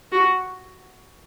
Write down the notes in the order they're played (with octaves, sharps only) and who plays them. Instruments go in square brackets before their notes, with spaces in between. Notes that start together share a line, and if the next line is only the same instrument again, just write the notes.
[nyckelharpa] F#4